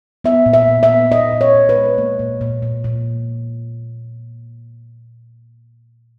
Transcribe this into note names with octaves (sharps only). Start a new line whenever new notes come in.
B3 E5
A#2
E5
A#2
E5
B3
A#2 D#5
A#2
C#5
A#2
B4
G#3
A#3
A#2
A#2
A#2
A#2